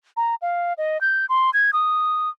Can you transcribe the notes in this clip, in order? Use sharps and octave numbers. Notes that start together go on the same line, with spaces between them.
A#5
F5
D#5
G6
C6
G#6
D#6